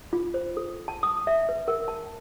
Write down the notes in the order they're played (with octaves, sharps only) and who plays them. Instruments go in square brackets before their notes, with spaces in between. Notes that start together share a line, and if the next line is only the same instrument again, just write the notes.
[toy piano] F4
C5
A4
A5
D#6
E5
B4
A#4
A5